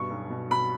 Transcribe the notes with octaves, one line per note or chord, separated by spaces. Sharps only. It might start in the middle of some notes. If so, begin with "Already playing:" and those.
Already playing: G2 B2 C#6
B1
B2
B2 B5